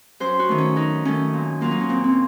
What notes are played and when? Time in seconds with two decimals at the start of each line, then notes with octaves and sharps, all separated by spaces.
0.20 F#2 C5
0.39 F#4
0.49 D#3 A3
0.58 C#4
0.76 F#2 D#4
1.05 D#3 A3 C#4
1.33 A#2
1.61 F#3 A#3 F4
1.71 D#4
1.81 C#4
1.89 A#2 C4
2.04 C4 C#4